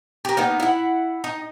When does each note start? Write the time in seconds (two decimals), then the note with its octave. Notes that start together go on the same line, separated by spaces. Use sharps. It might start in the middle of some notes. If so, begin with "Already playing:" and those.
0.25 G4 A#4
0.37 A#3 B3 D#4
0.60 E4 F#5
1.24 D#4